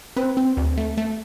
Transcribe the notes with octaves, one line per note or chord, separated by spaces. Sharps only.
C4 B4
C4
D2
A3
A3